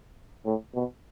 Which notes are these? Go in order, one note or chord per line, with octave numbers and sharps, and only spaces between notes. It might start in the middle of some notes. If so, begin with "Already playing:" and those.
A2
B2